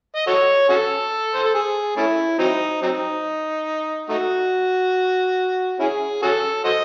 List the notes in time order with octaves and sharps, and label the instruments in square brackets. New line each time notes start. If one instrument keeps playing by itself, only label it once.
[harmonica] D#5
F#4 A4 C#5
C#4 F#4 A4
C5
A4
G#4
A3 C#4 E4
F#3 C4 D#4
F#3 C4 D#4
A3 D#4 F#4
C#4 E4 G#4
C#4 F#4 A4
F#4 C5 D#5